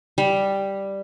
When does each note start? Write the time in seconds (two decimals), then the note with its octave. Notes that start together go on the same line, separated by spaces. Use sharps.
0.18 G3